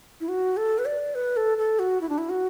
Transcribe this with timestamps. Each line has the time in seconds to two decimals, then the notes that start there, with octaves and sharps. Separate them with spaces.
0.20 E4
0.28 F#4
0.57 A4
0.78 B4
0.85 D5
1.15 B4
1.37 A4
1.58 A4
1.79 F#4
2.01 E4
2.09 D4
2.18 E4
2.29 F#4